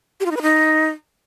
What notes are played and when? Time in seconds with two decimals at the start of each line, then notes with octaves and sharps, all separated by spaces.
0.20 G4
0.26 F4
0.31 D#4
0.36 B4
0.42 D#4